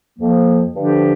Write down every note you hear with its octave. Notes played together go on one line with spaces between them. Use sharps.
F2 F3 A#3
G2 D3 F3 D4 G4